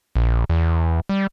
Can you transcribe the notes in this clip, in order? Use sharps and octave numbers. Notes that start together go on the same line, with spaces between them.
A#1
E2
G3